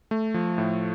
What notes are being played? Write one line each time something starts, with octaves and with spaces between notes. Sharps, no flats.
A3
F3
A2